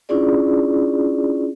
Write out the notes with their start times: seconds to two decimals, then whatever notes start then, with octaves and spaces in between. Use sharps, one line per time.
0.09 C#4 D4 E4 F4 G#4 D5